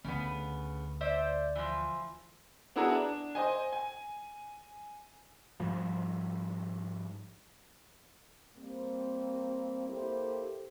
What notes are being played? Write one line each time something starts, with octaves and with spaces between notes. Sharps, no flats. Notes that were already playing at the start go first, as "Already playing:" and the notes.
D2 C#3 B3
C5 D5 E5
E3 F3
B3 D4 E4 F#4 G#4 A#5
D4
C5 D#5 G#5
G#5
G#2 F3 G3
G3 A#3 C4
A#3 E4 G4 A4 C5